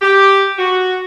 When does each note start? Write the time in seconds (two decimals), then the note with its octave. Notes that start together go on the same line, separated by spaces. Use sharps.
0.01 G4
0.59 F#4